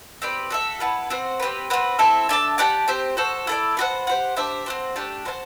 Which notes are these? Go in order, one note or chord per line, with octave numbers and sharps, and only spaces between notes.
C4 G4 B4 D5
F#4 A4 E5
E4 B4 F#5 A5
C4 F#4 C5
C4 G4 B4
C4 F#4 B4
C4 E4 A4 E5
D4 A4 E5 A5
G4 D5 F#5 A5
C4 G4 C5
F#4 A4 C5
E4 A4 D5
B3 F#4 C5 F#5
G4 C5 F#5
D4 G4 C5 E5
C4 F#4 C5
A3 D4 G4
F#4 C5 E5 A5